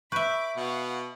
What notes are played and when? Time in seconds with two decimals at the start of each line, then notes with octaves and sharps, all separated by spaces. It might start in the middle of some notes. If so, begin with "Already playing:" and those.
0.12 B4 E5 B5 C#6 D6 G6
0.57 B2 F5 F#5